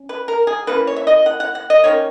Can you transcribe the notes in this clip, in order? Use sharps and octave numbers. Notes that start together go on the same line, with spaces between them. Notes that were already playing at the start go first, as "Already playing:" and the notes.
Already playing: C#4
B4
A#4
G#4
E3 A#3 C#4 B4
C#5
E5
D#5
F#5
F#5
F#5
D#5
D#3 A#3 C#4 C#5